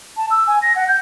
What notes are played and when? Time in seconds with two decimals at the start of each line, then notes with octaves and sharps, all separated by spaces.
0.17 A5
0.31 E6
0.47 G#5
0.62 A#6
0.76 F#5
0.88 G6